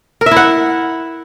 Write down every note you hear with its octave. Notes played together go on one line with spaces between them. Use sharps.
A#4
E5
E4
F#5